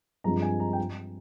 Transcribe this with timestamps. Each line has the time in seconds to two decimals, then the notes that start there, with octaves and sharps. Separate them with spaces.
0.24 G2 F3 G#3 C4 A#5
0.42 G#5
0.60 A#5
0.73 G5